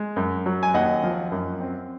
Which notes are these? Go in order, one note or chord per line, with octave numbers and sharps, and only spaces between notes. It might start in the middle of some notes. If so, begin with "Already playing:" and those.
Already playing: G#3
F#2
F#3
G#5
D#2 D#5 F#5
F3
F#2
C4